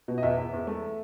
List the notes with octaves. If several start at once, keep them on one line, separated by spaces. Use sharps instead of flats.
B2
D#5
E2 E5
E2
E2
A3